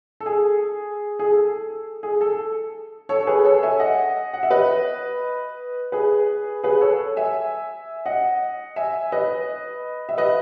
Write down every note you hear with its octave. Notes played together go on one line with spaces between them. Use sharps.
A4
G#4
G#4
A4
G#4
A4
A4 C#5
C#5
G#4 B4
A4 C#5
E5 G#5
D#5 F#5
F#5
E5
B4 D#5
G#4 B4
G#4 B4
A4 C#5
E5 G#5
D#5 F#5
E5 G#5
B4 D#5
E5
B4 D#5